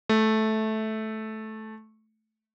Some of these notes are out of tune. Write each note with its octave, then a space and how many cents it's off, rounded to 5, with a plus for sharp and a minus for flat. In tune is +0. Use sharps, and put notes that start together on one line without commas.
A3 -10